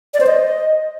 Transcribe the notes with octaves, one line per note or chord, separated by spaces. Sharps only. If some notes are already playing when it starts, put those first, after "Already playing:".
D5
C5
D#5